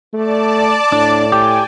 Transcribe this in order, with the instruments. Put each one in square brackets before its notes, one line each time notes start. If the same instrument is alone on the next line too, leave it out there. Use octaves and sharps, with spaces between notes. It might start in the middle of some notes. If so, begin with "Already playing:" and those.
[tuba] A3 [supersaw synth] D5 A5 D6
[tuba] A2 [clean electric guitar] D4
[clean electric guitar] G4 [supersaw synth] G5 G#5